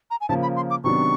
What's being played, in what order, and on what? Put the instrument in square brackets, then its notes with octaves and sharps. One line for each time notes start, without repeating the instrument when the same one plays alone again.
[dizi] A#5
G#5
[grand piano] C#3 F3 A#3 [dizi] A5
[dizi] B5
C6
D6
[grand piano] C3 D#3 F#3 B3 D4 [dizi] C#6